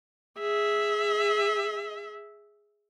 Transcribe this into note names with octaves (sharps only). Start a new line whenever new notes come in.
G#4 E5